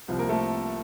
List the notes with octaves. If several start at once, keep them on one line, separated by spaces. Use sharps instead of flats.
C2 C3 F3
A#3 A#4
A3 A4